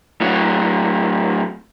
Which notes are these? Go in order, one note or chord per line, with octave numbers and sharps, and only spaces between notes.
A2 F#3